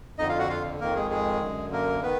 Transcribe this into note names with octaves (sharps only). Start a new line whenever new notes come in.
F2 D3 D#4 D#5
F4 F5
F#4 F#5
F4 F5
F2 D#3 A#3 A#4
G#3 G#4
G#3 G#4
F#2 D3
A#3 A#4
D#3 B3 B4